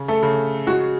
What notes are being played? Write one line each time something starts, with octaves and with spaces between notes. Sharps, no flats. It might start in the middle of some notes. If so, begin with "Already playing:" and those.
Already playing: C#3
A3 A4
C#3
G#3 F#4